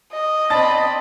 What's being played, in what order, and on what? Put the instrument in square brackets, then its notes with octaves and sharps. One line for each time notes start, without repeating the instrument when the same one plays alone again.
[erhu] D#5
[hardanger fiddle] C4 B5 [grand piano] D5 A5 A6